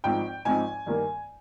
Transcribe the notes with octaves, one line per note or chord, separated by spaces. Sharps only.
G#1 G#2 F3 C4 D#4 G5
G#1 G#2 F3 C4 D#4 G#5
G2 D#3 A#3